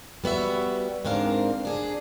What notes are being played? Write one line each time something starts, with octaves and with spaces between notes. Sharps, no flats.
G3 B3 F#4 E5
G#2 C4 D4 A#4 F5
D4 G#4